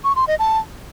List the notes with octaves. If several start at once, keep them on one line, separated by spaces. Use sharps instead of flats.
C#6
C6
D#5
A5